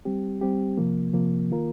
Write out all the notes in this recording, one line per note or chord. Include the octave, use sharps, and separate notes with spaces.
G3 C4 G4
G3 C4 G4
C3 F3 A#3
C3 F3 A#3
D#3 A#3 F4 A#4